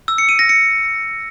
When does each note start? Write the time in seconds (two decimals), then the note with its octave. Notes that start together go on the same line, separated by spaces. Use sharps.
0.08 E6
0.18 C#7
0.29 D#7
0.39 A#6
0.49 C#7